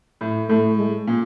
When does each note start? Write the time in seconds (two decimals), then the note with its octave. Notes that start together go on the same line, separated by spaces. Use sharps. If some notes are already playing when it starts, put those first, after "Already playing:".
0.21 A2
0.49 A2 A3
0.78 G#3
1.08 A#2